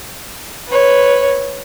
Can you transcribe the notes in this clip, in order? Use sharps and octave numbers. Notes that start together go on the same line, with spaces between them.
B4 C#5